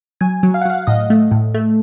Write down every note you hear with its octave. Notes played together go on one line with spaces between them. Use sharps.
F#3 G#5
F#3
F5
F#5
F#3 F5
A2 D#5
A3
A2
A3